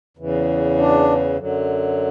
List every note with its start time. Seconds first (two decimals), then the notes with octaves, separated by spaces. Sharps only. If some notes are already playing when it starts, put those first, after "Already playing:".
0.17 E2 C#3 E3
0.78 D4
1.37 F#2 D3 F#3